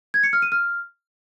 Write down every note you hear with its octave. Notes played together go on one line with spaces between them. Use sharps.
G#6
C#7
F6
D#7
F6